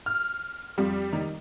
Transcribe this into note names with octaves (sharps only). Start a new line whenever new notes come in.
F6
F2 G3
D#3